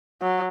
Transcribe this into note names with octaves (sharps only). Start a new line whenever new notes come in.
F#3